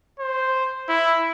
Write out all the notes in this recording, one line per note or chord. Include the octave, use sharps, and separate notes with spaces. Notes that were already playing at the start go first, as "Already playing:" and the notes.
C5
E4